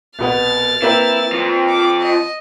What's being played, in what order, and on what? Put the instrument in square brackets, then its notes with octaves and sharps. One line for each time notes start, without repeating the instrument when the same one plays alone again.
[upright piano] C2 B2 B3 [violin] F6 A6
[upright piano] A#3 C4 B4 [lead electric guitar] E4
[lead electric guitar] F2 F3
[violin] D6
D#5